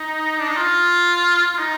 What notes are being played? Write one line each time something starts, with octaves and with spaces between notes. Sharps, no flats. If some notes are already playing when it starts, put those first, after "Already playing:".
Already playing: D#4
D4
D#4
F4
F4
D#4